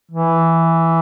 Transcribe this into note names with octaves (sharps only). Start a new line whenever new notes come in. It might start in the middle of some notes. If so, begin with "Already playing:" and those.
E3